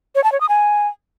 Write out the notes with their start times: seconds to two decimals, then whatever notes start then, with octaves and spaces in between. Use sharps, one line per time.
0.15 C#5
0.24 A5
0.32 C#5
0.41 D#6
0.49 G#5